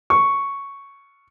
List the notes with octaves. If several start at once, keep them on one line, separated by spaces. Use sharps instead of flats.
C#6